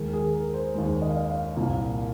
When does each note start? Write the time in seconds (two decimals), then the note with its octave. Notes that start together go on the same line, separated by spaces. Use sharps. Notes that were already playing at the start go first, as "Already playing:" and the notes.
Already playing: D#2 D#3 G#3 A#4
0.13 G#4
0.34 A#4
0.54 C5
0.74 D#2 D#3 G#3 C5
1.02 D#5
1.09 F5
1.17 D#5
1.29 F5
1.56 C2 A#2 A#3